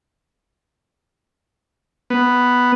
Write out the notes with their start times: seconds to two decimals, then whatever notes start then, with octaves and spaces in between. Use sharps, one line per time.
2.10 B3